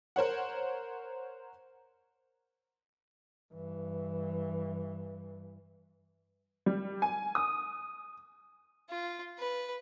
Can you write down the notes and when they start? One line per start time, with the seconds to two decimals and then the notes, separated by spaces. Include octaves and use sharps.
0.16 A#4 C5 C#5 F#5
3.53 G2 E3
6.66 G3
7.02 G#5
7.35 D#6
8.90 F4
9.39 B4